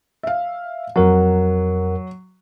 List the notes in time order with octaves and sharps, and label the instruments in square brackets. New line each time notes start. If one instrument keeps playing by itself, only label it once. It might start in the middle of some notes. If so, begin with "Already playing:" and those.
[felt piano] E5 F5
[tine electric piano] F2 A#4 F#5 [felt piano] F#3